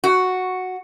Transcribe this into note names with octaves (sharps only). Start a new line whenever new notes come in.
F#4